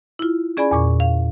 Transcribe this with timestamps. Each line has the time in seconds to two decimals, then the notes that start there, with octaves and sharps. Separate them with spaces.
0.19 E4 F4
0.57 C#4 G#4 D5 G#5 B5 G#6
0.71 E2 A#2 C#6
1.00 F5